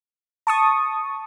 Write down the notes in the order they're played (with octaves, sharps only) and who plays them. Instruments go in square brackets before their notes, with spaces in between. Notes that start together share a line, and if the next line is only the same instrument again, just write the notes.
[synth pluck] A5 C#6 D#6